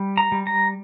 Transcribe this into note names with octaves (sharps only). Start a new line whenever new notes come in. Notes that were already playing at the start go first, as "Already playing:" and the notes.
Already playing: G3
A#5
G3
A#5